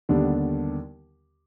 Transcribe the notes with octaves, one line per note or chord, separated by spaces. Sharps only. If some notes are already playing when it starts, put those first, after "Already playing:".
D#2 D3 G3 B3 D4